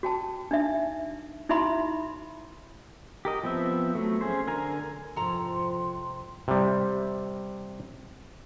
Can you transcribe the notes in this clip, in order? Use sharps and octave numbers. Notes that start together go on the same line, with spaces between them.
F#4 G5 A5
D4 D#4 E5
D#4 E4 F#4 E5 B5 C6
G4 A#4 D#5
F3 B3 C4 E5
F#3 A3
C#4 G#4 C5
D3 A#4 G#5 A#5
F2 G#2 C3 F3 A4 A#5 C6
C3 G3